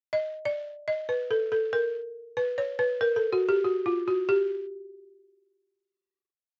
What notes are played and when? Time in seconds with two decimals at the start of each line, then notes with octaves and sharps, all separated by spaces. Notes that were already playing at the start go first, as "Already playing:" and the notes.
0.13 D#5
0.45 D5
0.88 D#5
1.09 B4
1.31 A4
1.52 A4
1.73 A#4
2.37 B4
2.58 C#5
2.79 B4
3.01 A#4
3.16 A4
3.33 F#4
3.49 G4
3.64 F#4
3.86 F4
4.08 F#4
4.29 G4